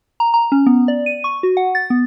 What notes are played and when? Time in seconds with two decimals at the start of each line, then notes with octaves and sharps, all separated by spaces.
0.20 A#5
0.34 A#5
0.52 C#4
0.66 B3
0.88 D5
1.06 D#7
1.24 C#6
1.43 F#4
1.57 F#5
1.75 A6
1.90 B3